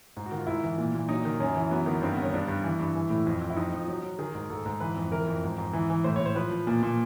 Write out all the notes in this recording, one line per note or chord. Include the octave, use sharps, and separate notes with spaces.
G#2
F#4
D#3 F4
G#2 E4
E3
A#2
A#2
F#3 D#4
D#3
F#2 C#4
E3
F#3 B3
D#3 B3
G2 C4
B3
D#3 C#4
G2 D4
G2
E3
G2
E3
A2
F2
F2
E4
F2 D#4
F3
F#3
F#3
D#3 G#4
G#2
G#2 A4
G#2
E3 B4
F2
E3 A#4
F2
G#2
G#2
E3
E3
A2 C5
C#5
A2
C5
F3 B4
F3
A#2
A#2